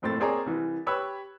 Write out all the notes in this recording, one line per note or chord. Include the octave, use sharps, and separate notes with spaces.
F#1 F2 A2 C4 A4 A6
A#3 C4 G#4 C#5 D5 A#5
C2 E3
G4 B4 C#5 B5 E6 F#6